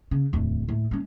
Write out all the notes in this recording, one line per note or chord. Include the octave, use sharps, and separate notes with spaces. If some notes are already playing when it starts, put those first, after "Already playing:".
C#3
D1 E2
A2
G#3 C#4